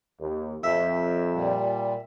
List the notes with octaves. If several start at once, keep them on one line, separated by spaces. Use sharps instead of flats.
D#2
F2 E5
A#2 G3